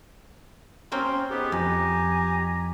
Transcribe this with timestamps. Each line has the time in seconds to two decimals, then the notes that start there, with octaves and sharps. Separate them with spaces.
0.92 A#3 C4 C#4 C6
1.30 F2 G#2 B3 G4
1.52 F2 G#5 A#5